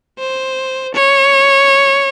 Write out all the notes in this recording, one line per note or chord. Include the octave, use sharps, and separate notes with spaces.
C5
C#5